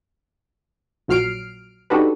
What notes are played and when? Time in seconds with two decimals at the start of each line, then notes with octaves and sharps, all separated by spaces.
1.08 A#1 A#2 F#3 F6 C7 D7
1.90 D4 D#4 F#4 G4 A4 B4